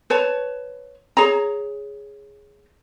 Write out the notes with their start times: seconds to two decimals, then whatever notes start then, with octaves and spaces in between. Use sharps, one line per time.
0.10 B4 C#5 A5
1.17 G#4 C#5 A#5